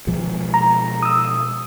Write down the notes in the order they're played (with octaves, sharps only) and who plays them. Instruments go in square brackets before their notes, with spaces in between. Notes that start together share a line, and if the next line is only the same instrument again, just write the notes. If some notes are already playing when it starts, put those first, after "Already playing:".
[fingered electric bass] B2 F3 G#3
[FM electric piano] A#5
D#6 E6